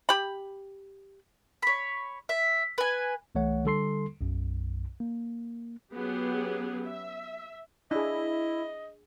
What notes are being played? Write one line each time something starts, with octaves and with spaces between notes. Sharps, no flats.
G4 B5
C#5 B5
E5
B4 G#5
C2 E3 A3 C#5 F#5
D3 G3 A4 C6 C7
B1 F#2
A#3
F#3 B3 C#4 G4 G#4
E5
D4 E4 G#4 D#5